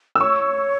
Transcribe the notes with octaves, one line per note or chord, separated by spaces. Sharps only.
E6
C#5 C#6